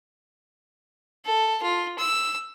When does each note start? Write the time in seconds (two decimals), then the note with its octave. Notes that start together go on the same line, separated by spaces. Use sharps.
1.25 A4
1.62 F4
1.98 E6